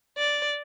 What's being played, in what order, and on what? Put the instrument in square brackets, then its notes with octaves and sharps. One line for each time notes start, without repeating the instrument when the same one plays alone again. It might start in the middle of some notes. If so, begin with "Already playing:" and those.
[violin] D5